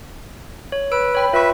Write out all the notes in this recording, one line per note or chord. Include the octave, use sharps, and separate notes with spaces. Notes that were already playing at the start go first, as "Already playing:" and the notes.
C#5
B4 E6 D7
C#5 G5 B5
F4 B4 E5 B5 C#6